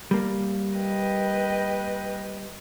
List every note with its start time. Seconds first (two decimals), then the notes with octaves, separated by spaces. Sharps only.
0.11 G3 A#3
0.77 B4 D#5 G5